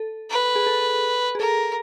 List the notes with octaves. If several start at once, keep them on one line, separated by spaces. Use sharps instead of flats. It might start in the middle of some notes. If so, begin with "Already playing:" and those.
Already playing: A4
B4
G#4
A4
G#4
A4 A#4